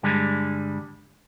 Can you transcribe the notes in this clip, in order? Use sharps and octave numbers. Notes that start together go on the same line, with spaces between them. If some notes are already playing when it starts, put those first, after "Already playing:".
G2 D3 G3 G#3